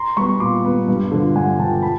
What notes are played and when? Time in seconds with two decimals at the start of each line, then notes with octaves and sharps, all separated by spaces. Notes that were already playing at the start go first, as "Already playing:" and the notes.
Already playing: A#5 C6
0.16 G3 B3 B5 C#6
0.40 A#2 C6 D6
0.65 G3 B3
0.88 G2
1.12 D3 F3
1.36 G2 F#5 G#5
1.59 D3 F3 G5 A5
1.82 A5 B5